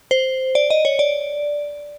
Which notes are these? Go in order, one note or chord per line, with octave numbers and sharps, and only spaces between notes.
C5
D5
D#5
C#5
D5